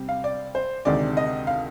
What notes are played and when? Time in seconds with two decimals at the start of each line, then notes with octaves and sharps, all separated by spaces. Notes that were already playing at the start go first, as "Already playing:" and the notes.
Already playing: C3 G3 C4
0.09 F5
0.24 D5
0.55 C5
0.85 D2 C3 D#3 G#3 D5
1.17 D#5
1.47 F5